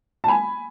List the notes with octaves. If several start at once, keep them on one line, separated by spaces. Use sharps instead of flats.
A5
G#5 B5